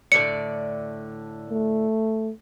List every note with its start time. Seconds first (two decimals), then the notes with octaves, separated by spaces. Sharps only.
0.12 A2 D3 D5 C#7
1.50 A3